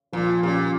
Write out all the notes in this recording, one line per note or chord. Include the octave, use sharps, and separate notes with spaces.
A#2 F3
A#2 C#4 G4